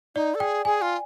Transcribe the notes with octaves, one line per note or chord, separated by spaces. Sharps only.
D#4 D5
A4
G#4 G5
G#4 G#5
F4